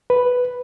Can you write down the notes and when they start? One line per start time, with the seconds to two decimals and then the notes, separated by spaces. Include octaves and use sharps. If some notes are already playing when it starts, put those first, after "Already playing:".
0.10 B4